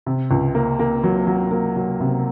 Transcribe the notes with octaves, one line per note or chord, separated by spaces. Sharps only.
C3
C#2
A#3
A#3
F#3
F#3
A#3
F#3
C3